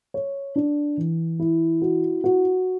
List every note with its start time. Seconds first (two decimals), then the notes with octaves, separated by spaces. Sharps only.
0.14 C#5
0.56 D4
0.97 E3
1.39 E4
1.82 F#4
2.24 F#4